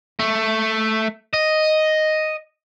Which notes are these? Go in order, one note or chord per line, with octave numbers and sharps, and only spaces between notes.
A3
D#5